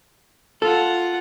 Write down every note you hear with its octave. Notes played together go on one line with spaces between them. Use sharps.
F4 A4 F#5